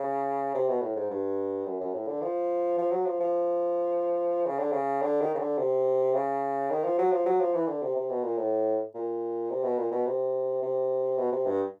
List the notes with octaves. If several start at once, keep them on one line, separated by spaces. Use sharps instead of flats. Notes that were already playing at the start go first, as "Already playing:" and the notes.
Already playing: C#3
C3
B2
A2
G#2
G2
F#2
F#2
A2
D3
F3
F3
F#3
F3
F3
C#3
D3
C#3
D3
D#3
C#3
D3
C3
C#3
D#3
F3
F#3
F3
F#3
F3
E3
D3
C3
C3
B2
A#2
A2
A#2
C3
B2
A#2
B2
C3
C3
B2
C3
G2